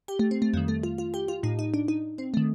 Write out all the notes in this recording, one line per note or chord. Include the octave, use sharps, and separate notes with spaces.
G4
A3
C4
A3
F2 D#3 G3
A3
F4
F4
G4
F4
A2 D#4
D#4
D4
D#4
C4
A3
D#3